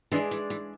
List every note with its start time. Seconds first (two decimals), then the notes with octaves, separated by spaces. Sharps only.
0.11 E3 G#3 D4 G#4 D5
0.31 E3
0.50 E3